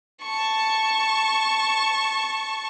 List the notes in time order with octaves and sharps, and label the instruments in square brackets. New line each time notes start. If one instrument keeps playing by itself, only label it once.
[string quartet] A5 C#6